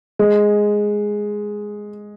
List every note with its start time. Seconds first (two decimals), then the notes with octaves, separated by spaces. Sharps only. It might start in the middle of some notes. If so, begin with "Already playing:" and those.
0.19 G#3